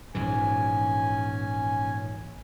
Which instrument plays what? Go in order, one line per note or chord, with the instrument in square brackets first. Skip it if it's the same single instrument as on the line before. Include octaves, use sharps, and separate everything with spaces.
[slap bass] A#1 G#2 E3 [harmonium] C#4 G#5